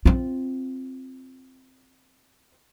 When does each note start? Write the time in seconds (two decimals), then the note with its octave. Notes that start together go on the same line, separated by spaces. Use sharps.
0.05 C4 F4